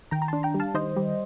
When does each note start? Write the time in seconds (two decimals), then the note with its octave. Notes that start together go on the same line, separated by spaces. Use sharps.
0.11 D#3 G5 A#5
0.22 A#5
0.28 D4 A5 C6
0.43 G5 A#5
0.54 G3
0.60 F5 A5
0.74 D#3 C5 D#5
0.97 G3